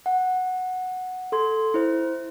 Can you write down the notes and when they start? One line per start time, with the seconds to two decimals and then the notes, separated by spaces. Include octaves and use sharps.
0.06 F#5
1.32 A4 C6 G#6
1.74 E4 C5